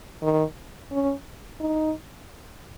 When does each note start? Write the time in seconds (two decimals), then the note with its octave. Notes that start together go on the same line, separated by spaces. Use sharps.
0.22 D#3
0.92 C#4
1.60 D#4